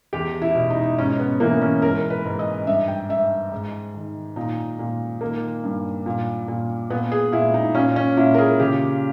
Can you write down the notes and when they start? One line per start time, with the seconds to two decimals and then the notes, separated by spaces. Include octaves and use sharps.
0.13 E2 G4
0.42 E4
0.55 B2
0.70 D#4
0.98 G#2 C#4
1.20 B3
1.40 E3 A#3
1.61 C#4
1.82 G#2 A#4
2.10 B4
2.25 G#2
2.39 D#5
2.67 G2 E5
2.88 G5
3.09 G2 E5
3.52 G#2
3.94 D#3
4.36 A#2 D#4
4.79 A#2
5.21 D#3 A#3
5.64 G2
6.06 A#2
6.48 A#2
6.90 A#2 B3
7.12 G#4
7.32 A#2 E4
7.54 D#4
7.75 A#2 C#4
7.96 C#4
8.17 A#2 E4
8.34 A#4
8.38 G#4
8.60 C#3 G4